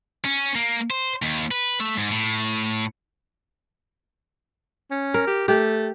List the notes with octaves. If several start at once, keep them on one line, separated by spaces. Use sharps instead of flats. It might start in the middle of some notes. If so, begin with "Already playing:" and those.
C#4
A#3
C5
D#2
B4
A3
G#2
A2
C#4
A#4
G4
A3 G4